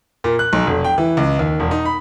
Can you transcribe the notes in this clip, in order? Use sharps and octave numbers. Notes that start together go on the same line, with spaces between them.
A#2
F#6
B1
F1
G5
E3
C#2
D#2
E1
D#4
B5